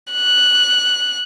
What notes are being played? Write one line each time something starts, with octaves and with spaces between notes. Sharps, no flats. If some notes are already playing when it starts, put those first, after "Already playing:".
F#6